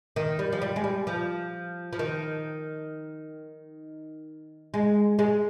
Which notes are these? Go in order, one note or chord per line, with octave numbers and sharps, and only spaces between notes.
D#3
G3
F3
G3
G#3
G3
F3
F3
D#3
G#3
G#3